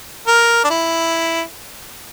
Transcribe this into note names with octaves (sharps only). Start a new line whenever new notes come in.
A#4
D4
E4